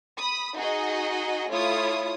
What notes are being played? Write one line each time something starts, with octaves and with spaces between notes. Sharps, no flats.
B5 D#6
D#4 F#4 G#4 D#5
A3 E4 F4 C#5 D#6